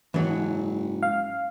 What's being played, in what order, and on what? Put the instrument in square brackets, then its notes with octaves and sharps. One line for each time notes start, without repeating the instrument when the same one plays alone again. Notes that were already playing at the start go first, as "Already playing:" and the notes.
[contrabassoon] F#1 [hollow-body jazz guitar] G#2 F#3 [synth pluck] E3
[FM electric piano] F5